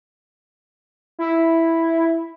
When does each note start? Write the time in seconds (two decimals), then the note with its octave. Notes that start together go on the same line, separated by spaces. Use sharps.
1.19 E4